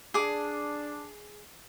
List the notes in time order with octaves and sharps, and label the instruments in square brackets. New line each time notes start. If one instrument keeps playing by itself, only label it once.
[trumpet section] D4 [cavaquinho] G#4 D6